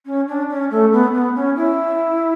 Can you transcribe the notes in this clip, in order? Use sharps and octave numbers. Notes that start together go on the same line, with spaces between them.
C#4
D4
C#4
A3
B3
B3
C#4
E4